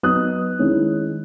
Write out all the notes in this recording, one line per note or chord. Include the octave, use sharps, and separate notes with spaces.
F#3 B3 D#4 D#6 F#6
D#3 G#3 C#4 E4